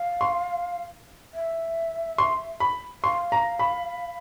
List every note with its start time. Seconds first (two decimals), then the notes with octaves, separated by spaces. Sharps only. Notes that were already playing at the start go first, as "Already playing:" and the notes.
Already playing: F5
0.21 C6
1.34 E5
2.18 C6
2.60 B5
3.03 F5 C6
3.32 A#5
3.59 B5